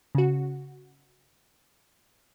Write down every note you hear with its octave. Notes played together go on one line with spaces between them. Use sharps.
C#3 F#4